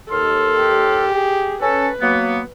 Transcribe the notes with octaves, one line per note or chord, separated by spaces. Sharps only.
D#2 A4 C6 F6
G4
G#4
C#4 A4 B4
F#3 A#3 B3